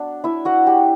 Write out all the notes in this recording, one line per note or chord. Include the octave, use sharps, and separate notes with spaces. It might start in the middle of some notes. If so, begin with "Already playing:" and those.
Already playing: F#3 B3 D4 D5
E4 E5
F#4 F#5
G4 G5